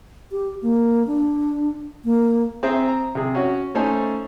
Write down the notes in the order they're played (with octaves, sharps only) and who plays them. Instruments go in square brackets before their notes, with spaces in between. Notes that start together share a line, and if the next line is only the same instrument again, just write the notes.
[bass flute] G4
A#3
D4
A#3
[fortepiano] C4 G#4 C5 E5 A#5
A#5
C3 G#4
C#4 F#4 C#5
A3 C#4 D#4 C5 G#5 A5